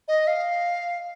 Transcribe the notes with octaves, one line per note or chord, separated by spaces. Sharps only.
D#5
F5